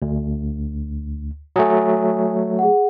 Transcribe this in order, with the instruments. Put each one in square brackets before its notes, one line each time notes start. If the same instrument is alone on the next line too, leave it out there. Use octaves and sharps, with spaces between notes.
[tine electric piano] D2
[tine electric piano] F#3 A3 [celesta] G#5 D#6
[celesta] G#4 F#5